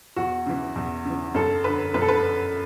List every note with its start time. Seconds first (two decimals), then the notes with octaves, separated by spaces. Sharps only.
0.16 E2 F#4
0.46 C#3 E3
0.76 E2
1.05 C#3 E3
1.34 F#2 A4
1.64 D3 B4
1.94 F#2 B4
2.01 A4
2.08 B4